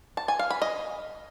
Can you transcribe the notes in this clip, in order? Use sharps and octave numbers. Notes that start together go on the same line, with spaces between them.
A5
G#5
F5
B5
D#5